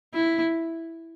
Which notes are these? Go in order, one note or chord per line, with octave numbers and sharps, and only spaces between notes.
E4